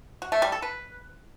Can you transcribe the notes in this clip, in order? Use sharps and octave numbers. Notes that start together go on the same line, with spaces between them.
F#4
A3
G3
A4
B4